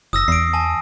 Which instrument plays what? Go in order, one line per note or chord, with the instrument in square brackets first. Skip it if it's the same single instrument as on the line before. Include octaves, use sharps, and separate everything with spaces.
[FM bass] F#1 [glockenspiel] D#6 E6 A#6
[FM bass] E2 [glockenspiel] C7 D7
[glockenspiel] G#5 A5